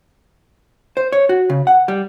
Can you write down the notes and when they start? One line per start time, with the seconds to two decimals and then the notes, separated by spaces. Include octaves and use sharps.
0.97 C5
1.12 C#5
1.29 F#4
1.50 C#3
1.67 F#5
1.88 G3